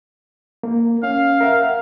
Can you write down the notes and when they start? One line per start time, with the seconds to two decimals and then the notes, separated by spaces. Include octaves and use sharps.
0.63 A#3
1.03 C#4 F5
1.41 A#4 E5 F#5